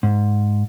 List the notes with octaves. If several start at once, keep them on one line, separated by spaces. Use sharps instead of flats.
G#2